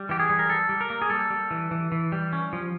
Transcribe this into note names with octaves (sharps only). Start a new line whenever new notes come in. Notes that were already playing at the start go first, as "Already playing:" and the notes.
Already playing: G3
E3 G4
G#4
G3
A#4
G3 A4
G3
A#4
A#3
G#4
G3 A4
G3
E3
E3
E3
G3
C#4
F3